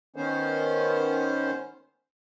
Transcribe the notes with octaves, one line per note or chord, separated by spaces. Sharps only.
D#3 B3 C#4 C5